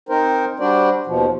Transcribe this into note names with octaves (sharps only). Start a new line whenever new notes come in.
C4 D#4 A#4 C5
G3 D4 F#4 C5 D5
D#2 B2 F3